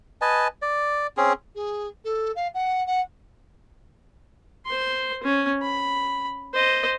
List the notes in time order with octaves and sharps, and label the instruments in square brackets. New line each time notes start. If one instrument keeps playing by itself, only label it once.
[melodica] B4 D#5 G#5 A5
D5
C4 C#4 G#4
[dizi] G#4
A4
F5
F#5
F#5
[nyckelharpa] C5 C6
C#4
B5
C5 D#5